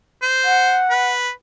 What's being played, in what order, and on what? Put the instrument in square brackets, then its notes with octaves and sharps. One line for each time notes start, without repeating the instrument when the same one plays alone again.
[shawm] C5
[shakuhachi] F#5
[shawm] B4